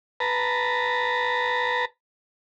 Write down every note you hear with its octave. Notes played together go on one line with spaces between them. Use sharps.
B4 A5 A#5